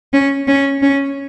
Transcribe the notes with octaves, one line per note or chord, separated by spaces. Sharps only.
C#4
C#4
C#4